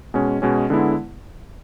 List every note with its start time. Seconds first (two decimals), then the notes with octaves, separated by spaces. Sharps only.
0.14 B2 G#3 C#4
0.42 B2 G#3 C#4
0.70 D3 G#3 B3 E4